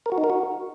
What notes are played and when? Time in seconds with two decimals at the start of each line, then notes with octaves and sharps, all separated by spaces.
0.06 A#4
0.12 F#4
0.18 D#4
0.24 A#4
0.30 F#4